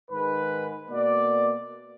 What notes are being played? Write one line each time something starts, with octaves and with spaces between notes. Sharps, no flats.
G#2 D#3 G#3 B4
B2 A#3 D5